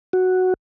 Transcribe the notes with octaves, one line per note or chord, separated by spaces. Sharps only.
F#4